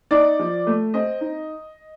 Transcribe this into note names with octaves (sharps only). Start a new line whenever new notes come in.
D#4 D5
F3
A3
C4 D#5
D#4